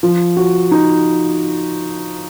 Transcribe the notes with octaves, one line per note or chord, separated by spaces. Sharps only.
F3
F#4
D#4